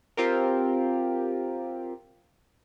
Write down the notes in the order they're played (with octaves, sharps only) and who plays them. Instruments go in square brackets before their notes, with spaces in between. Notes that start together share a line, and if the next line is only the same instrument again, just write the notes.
[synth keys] C4 F4 G4 A#4